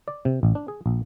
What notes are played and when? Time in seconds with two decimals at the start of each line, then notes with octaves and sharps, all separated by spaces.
0.08 D5
0.25 C3
0.43 A1
0.55 D4
0.68 G#4
0.86 A#1